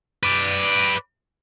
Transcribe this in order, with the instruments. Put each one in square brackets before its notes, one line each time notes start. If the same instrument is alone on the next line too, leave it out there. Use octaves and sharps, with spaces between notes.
[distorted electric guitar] B4 D5